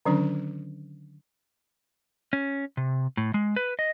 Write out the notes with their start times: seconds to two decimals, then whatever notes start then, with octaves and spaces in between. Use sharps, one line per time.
0.05 D3 D#3 F#3 C#4 D4
2.33 C#4
2.77 C3
3.17 A2
3.34 G#3
3.56 B4
3.79 D#5